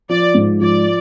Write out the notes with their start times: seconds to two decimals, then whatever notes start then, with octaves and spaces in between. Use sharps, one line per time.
0.09 F3 D5
0.35 G#2
0.60 F3 D5